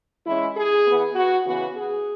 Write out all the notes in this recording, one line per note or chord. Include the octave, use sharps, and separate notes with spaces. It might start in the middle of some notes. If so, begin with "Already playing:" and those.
E3 G#3 C#4 E4
G#4
E3 B3
F#4
C#3 E3 B3 F#4
G#4